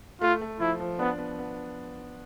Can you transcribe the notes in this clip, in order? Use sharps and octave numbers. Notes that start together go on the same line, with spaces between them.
A3 F4
A3
F3 E4
F3
B3 D4
B3
B3